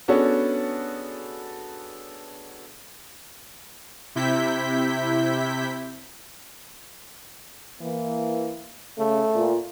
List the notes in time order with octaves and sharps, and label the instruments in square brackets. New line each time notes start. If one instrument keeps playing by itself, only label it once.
[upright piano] B3 C#4 D4 F#4 G#4 A4
[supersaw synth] C3 E4 G6 B6
[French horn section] E3 A#3
[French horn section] C#3 [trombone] A3
[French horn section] A#2 F4